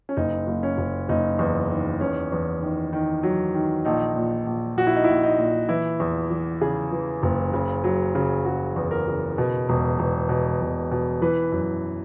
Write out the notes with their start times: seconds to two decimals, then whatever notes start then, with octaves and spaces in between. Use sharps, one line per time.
0.09 C#4
0.17 F#1 D#4
0.47 F#1
0.63 C#4
0.78 F#1
1.09 F#1 D#4
1.39 E2
1.70 D#3
2.01 E2 C#4
2.32 E2
2.62 D#3
2.93 D#3
3.23 F#3
3.54 D#3
3.85 A#1 D#4
4.16 A#2
4.47 A#1
4.77 A#1 F#4
4.87 E4
4.96 D#4
5.04 A#1 E4
5.23 D#4
5.39 A#2
5.69 E3 E4
6.00 E2
6.31 E3
6.61 C#3 G#4
6.92 E3
7.23 F#1
7.53 C#3
7.84 F#3
8.15 C#3
8.45 C#3 F#4
8.76 E2
8.91 A#4
9.07 C#3
9.38 B2
9.69 E1
9.99 E1
10.29 B2
10.61 E1
10.91 B2
11.22 E3 B4
11.52 F#2